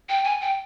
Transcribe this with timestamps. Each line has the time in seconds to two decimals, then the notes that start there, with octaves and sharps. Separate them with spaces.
0.09 G5
0.24 G#5
0.41 G5